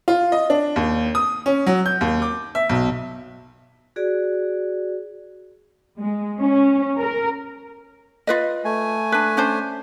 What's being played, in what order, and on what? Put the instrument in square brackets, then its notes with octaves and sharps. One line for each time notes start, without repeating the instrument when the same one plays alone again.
[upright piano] F4
D#5
D4
D#2
D#6
C#4
F#3
G6
D#2
D6
E5
B1
[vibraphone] F#4 G#4 D5
[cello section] G#3
C#4
A#4
[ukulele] F4 B4 D#5
[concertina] A3 G#5
[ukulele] D4 B4
C#4 D4 C5